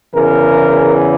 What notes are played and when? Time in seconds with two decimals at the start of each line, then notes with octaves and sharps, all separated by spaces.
0.13 E2 C#3 E3 A#4